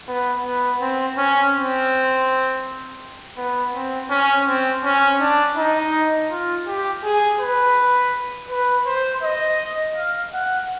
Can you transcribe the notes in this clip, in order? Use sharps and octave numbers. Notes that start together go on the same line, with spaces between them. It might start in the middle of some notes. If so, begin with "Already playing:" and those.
B3
B3
C4
C#4
C4
B3
C4
C#4
C4
C#4
D4
D#4
F4
G4
G#4
B4
B4
C5
D#5
F5
F#5